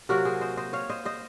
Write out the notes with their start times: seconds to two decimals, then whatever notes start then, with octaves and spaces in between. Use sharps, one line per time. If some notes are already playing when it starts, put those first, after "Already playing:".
0.09 C3 F#3 A#3 F#4 A#4
0.25 G#4 C5
0.41 C5 D#5
0.57 C5 D#5
0.73 C#5 F5
0.90 C5 D#5
1.05 C5 D#5